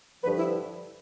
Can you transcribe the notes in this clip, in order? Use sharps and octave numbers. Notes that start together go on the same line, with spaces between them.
G2 D3 F3 B4
E4